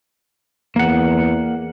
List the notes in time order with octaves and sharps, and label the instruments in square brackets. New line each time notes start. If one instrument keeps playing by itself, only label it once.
[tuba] E2 [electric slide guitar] A#3 F#5